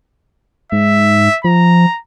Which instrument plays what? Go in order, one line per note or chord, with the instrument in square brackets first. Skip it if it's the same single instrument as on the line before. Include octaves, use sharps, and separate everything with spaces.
[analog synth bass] G#2 [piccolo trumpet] E5
[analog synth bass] F3 [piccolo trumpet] A#5